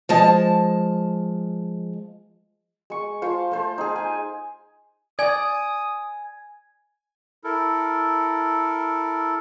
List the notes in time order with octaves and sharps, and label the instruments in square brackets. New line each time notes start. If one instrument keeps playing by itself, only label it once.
[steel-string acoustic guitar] F3 G#3 A5
[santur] G#3 C#6
F4 C5 A5 C#6
A3 C5 A5
D#4 G#4
G#5
[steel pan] D5 [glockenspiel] G#5 G#6 [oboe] D#6
[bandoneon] E4 A4 A#4